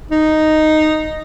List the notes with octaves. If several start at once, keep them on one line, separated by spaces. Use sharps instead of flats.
D#4